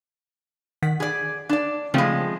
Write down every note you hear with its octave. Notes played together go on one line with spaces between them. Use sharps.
D#3 F#5 B6
G#4 D5
D4 D5
C#3 F3 G#3 A3 C4